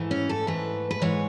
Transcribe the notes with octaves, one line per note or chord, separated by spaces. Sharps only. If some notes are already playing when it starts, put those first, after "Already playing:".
Already playing: G#2 E3 A3
C#4
A4
G#2 E3 A3 B4
B4
G#2 E3 G#3 C#5